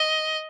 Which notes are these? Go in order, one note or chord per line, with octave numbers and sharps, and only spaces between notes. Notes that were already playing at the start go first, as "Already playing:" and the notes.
Already playing: D#5